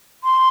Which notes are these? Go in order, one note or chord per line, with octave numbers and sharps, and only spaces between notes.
C6